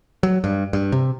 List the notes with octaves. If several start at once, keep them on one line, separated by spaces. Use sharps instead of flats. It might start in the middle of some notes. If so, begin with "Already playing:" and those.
F#3
G2
G2
C3